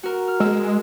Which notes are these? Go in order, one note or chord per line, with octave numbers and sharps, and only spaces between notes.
F#4 A#4
F6
G#3 E6